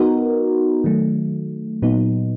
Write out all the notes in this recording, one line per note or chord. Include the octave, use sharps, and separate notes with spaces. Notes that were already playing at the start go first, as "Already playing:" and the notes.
Already playing: B3 D#4 F#4 A#4
D#3 F#3 A3
A#2 F#3 B3 D#4